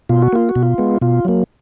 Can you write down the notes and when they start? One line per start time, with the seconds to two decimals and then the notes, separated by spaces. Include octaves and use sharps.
0.09 B2 F4
0.22 F#4
0.33 A#3 F4
0.49 F#4
0.56 B2
0.63 F4
0.78 G#3 B3
1.01 B2 F4
1.25 F#3 A#3